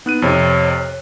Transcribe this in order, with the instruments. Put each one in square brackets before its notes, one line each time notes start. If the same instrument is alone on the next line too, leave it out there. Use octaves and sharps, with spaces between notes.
[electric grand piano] B3 F#6 D#7 [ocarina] D#4
[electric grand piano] F2 C3 [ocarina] C#5
[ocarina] C#5